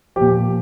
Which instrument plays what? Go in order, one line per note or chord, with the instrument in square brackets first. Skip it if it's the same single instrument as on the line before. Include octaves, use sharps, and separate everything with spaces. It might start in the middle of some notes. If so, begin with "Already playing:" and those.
[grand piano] A#2 F3 G4